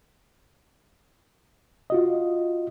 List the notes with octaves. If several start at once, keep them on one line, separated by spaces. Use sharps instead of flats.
F4 F#4 D#5